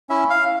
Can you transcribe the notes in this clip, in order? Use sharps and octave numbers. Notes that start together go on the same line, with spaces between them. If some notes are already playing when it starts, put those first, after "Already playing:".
C#4 E4 E5
F5